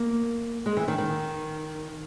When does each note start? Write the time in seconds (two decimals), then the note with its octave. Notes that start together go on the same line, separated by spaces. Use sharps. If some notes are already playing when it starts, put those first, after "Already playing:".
Already playing: A#3
0.66 G#3
0.77 E3
0.88 D#3
0.98 D#3